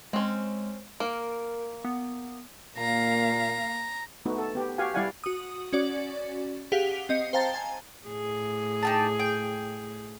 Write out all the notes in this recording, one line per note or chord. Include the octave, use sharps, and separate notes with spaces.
G#3 C4 C#4
A#3 A#4
B3
A#2 A#3 F5 A#5
A3 B3 D#4 F#4
A4
B3 G4
F#4 G4 F5 F#5 G#5
G3 E4 D5 F5 F#5 G#5
F#4 D#6
C#4 F#4 D5
G4 G#4 F5 F#5 B6 F7
C4 D#5 C7 C#7
C5 F5 G5 A5 A#5 A6
G#5
A2 G#4
D#4 G4 A5
G5